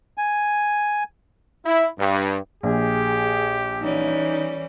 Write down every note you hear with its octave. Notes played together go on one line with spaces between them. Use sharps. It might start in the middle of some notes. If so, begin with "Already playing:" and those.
G#5
E4
G2
A#1 G4 G#4
E3 G3 C#4 D#4